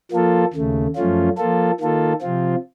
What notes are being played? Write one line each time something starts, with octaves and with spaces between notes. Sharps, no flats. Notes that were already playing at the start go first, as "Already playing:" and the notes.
F3 A#3 F4 A4
D#2 C#3 A3
F#2 F3 A3 C#4 F4
F3 A#3 F4 A4
D#3 A#3 F4 A4
C3 F3 C4 F4